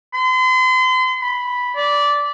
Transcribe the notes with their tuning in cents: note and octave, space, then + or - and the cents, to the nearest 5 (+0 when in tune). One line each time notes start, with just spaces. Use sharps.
C6 -40
B5 -5
D5 -15